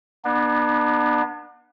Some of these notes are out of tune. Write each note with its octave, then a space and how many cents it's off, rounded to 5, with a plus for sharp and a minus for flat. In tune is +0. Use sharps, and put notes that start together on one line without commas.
B3 -30 D4 +35